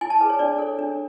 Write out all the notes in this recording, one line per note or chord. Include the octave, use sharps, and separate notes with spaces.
E4 G#5
A5
G#4 B4
C#5
D4 D5
A4 C#5
D4